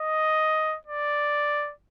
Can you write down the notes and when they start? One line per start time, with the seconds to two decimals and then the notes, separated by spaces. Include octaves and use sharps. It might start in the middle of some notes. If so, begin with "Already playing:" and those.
Already playing: D#5
0.87 D5